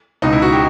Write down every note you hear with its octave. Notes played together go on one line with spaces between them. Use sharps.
C#2 B2 D#4
E4
F#4
G4